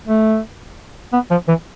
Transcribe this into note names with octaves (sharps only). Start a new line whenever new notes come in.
A3
B3
F3
E3